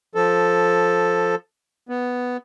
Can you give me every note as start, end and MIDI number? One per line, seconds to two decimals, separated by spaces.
0.15 1.35 53
0.15 1.35 69
1.89 2.37 59